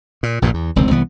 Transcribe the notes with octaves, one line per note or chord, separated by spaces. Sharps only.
A#2
A#1 G2 A#2
E2
E1 C#2 D#3 C4
C2 E3 B3